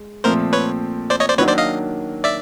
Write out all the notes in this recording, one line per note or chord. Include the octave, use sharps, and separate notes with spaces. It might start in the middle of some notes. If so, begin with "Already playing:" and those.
Already playing: G#3
A#2 F3 A3 C4 A#4 C5
B4 C#5
C5 D5
C#5 D#5
C5 D5
D#3 F#3 A#3 D4 B4 C#5
C5 D5
D#5 F5
D5 E5